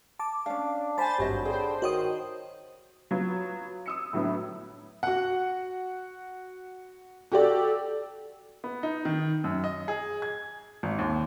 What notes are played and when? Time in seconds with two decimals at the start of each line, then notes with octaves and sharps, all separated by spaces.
0.19 A5 D6
0.46 C#4 D4 F5
0.98 C5 D5 G#5 A5 B5 A6
1.18 G#1 G2 F#3 G4 C5 D#5
1.45 D3 G#4 C5 G5
1.82 D#3 F#4 C#5 D#6
3.11 F#3 B3 F4
3.86 D#6 E6 C#7
4.13 A2 D3 F#3 B3 E4
5.03 F#4 F#5
7.32 F#4 G4 A4 D5
8.64 B3
8.83 D#4
9.05 D#3
9.44 F#2
9.64 D#5
9.88 G#4
10.22 G#6
10.83 G#1
10.99 D#2